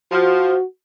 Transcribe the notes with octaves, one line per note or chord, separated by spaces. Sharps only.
F3 F#4